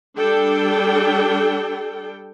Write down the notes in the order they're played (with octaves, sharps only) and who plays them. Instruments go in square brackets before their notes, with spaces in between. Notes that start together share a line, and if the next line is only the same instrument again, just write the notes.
[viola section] G3 D4 A4 G5